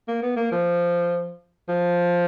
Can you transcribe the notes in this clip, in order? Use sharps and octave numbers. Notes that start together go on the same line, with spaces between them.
A#3
B3
A#3
F3
F3